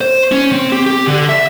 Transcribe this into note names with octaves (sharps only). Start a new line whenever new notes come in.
C5
C#4
C4
G4
G4
D3
E5